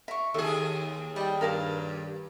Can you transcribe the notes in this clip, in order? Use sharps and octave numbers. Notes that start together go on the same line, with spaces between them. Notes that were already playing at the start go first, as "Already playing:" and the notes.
A#4 E5 C#6
D#2 G#4 A4 C#5 E5
G3 D#5 G5
G2 A4 A#4 F5 A5